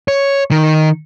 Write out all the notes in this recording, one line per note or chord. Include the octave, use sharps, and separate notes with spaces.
C#5
D#3